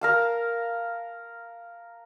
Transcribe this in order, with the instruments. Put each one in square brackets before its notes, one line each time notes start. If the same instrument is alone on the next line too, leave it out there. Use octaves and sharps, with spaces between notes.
[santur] A#4 F5 A5